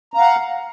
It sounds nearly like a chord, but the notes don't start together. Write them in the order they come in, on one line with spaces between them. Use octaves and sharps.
A#5 F5 F#5